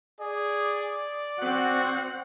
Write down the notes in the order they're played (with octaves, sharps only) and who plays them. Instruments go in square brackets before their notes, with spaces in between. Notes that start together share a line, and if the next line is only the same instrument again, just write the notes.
[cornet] G#4 [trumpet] D5
[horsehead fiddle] C4 F#5 [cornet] F#4